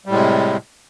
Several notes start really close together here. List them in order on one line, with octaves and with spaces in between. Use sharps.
G3 A2 G#3 C3